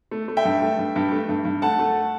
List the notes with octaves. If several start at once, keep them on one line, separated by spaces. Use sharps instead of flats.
A3
A3
E5 G5
G2
A3
G2
G2
A3
G2
G2
A3 F#5 A5
A3